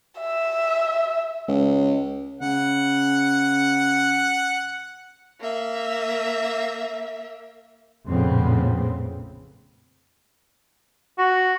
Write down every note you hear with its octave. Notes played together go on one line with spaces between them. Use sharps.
E5
C#2
C#3 F#5
A#3 E5
A#1 F2 A2 C#3 B3 C4
F#4